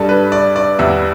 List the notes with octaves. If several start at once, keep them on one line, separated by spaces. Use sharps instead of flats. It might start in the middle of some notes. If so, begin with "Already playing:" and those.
Already playing: G2 G3 D4 A4
B4
D5
D5
E2 E3 G3 B3 E5